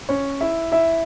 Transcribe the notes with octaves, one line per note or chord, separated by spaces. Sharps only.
C#4 C#5
E4 E5
E4 E5